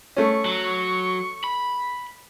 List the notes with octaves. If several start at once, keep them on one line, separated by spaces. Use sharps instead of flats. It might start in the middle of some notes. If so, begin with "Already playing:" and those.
A3 C#4 C#6
F#3
B5